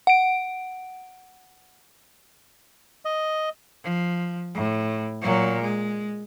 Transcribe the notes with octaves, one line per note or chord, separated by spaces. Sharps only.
F#5 D7
D#5
F3
A2
A#2 F#3
G#3